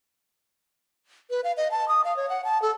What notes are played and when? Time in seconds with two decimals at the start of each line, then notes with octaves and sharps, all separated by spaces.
1.30 B4
1.44 F5
1.57 D#5
1.71 A5
1.88 D#6
2.04 F5
2.17 C#5
2.30 F#5
2.44 A5
2.62 A4